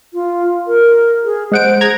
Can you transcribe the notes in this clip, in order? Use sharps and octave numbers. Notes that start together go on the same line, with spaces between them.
F4
A#4
G#4
G#3 C5 F#5 D7
G#4 A#5 G#6